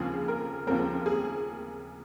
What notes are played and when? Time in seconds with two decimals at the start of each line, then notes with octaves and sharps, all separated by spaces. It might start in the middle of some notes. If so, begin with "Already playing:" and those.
Already playing: D#2 C#3 F3 C4 G#4
0.28 A#4
0.67 D#2 C#3 F3 C4 A#4
1.06 G#4